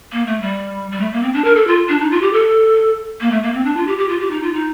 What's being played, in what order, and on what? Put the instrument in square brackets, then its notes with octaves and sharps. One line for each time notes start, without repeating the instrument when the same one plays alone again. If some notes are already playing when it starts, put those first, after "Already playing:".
[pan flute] A#3
A3
G3
G3
A3
A#3
C4
D4
A#4
A4
F4
D4
D#4
F4
G4
A4
A#3
A3
A#3
C4
D4
F4
G4
G4
F4
G4
D#4
F4
D#4